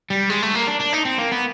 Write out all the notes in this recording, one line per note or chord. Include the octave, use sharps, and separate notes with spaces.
G3
G#3
A3
A#3
D4
D4
D#4
C4
A#3
B3